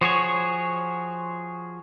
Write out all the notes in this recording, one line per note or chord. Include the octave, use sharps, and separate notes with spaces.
F3 F#4 G#4 C#5